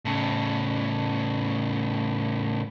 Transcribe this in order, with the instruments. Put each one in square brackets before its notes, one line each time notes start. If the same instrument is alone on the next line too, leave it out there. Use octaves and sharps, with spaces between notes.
[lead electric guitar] A2 C#3